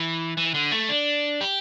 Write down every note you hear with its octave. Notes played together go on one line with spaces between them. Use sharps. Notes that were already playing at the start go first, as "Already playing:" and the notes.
Already playing: E3
E3
D3
A3
D4
G4